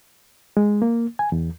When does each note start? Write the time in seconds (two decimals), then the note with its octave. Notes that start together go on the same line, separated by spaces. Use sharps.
0.57 G#3
0.82 A#3
1.19 G#5
1.32 E2